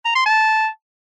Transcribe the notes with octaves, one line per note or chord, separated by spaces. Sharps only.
A#5
C6
A5